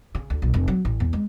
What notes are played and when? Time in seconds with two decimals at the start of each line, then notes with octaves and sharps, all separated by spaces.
0.15 C#3
0.30 D2
0.42 B1
0.54 F1
0.68 F#3
0.85 A1
1.00 E2
1.13 G#3